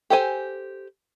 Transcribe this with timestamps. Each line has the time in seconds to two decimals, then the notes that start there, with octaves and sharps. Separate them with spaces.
0.10 G4 A4 C5 G#5